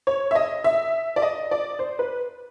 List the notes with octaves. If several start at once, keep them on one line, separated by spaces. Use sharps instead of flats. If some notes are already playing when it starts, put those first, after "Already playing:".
C#5
E5
D#5
E5
D5
D#5
D5
C5
B4